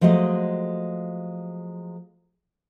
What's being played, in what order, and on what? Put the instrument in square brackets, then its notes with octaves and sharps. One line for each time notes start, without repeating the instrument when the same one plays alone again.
[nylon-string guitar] F3 F#3 G#3 A3 D#5